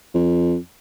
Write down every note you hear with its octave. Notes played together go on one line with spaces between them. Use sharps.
F2